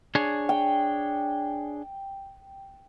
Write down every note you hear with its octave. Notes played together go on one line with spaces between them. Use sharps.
D4 G#4 C#5
G5